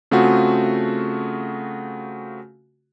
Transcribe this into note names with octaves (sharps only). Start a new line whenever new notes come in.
C#3 A3 C4 F4 F#4 G#4